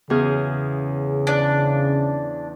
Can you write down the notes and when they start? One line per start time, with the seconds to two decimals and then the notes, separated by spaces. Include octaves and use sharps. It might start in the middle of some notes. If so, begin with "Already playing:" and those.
0.10 E2 C#3 G#4 F6
1.27 D4